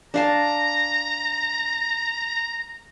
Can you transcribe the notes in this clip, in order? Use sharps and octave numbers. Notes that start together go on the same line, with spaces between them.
D4 F5 A5 A#5